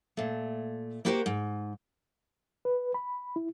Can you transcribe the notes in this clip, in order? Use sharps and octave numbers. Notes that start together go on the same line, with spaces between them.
A#2 A3
A#3 E4 F#4 G4 A#4 C5
G#2
B4
B5
E4